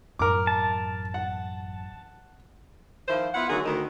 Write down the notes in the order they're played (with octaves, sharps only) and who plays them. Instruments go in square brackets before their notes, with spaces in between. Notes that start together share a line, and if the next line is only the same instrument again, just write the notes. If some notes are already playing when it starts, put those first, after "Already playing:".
[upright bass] A1 F#2 [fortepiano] A#4 D6
[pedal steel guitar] A5
[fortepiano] F#5
[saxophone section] D#3 F3 E4 F4 C5
B3 E4 F4 E5 F#5
D3 D#3 F#3 A3 G#4
D2 D#3